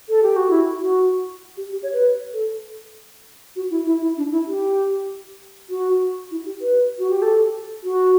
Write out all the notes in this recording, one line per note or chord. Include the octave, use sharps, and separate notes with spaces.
A4
G4
F#4
E4
F#4
G4
G4
C#5
B4
A4
F#4
E4
E4
E4
D4
E4
G4
F#4
E4
G4
B4
F#4
G4
A4
F#4